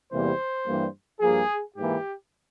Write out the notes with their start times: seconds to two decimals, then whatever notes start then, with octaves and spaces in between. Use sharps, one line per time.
0.12 E2 C3 E3 G3 A#3 C5
0.67 G2 E3 G3 A#3
1.21 G2 F3 A#3 G#4
1.76 G#2 E3 A#3 G4